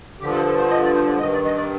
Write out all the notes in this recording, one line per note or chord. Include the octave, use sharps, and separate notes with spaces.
G2 D3 F3 G4
A4
A4
C5
D#5
D5
C5
D5
G2 D#3 D#5
D5
D#5
D5